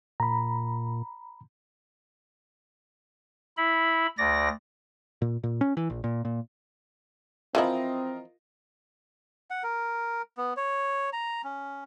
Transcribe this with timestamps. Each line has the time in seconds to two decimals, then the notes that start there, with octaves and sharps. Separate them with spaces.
0.20 A#2 A#5 B5
3.57 E4 B5
4.18 D2 D5 A#6
5.22 A#2
5.43 A#2
5.61 C#4
5.77 E3
5.90 A#1
6.04 A#2
6.25 A#2
7.55 E3 F3 C4 E4 F4 A#4 D#5
9.50 F#5
9.63 A#4
10.37 B3
10.57 C#5
11.13 A#5
11.44 C#4